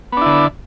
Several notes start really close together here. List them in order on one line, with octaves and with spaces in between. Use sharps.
B3 D4 E4 D3